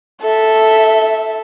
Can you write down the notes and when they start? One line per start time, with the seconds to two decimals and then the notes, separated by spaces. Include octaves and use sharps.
0.21 A4 E5